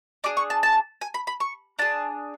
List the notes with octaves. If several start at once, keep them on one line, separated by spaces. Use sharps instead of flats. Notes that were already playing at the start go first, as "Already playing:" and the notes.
D4 G#4 D6
C#6
A5
A5
G#5
B5
B5
C#6
D4 G#4 A5